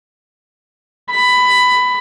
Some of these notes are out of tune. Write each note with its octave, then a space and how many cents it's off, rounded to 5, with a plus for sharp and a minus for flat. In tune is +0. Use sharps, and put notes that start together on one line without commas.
B5 +15